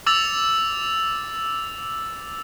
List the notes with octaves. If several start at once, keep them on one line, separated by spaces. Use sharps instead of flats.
D6 E6 A6 F7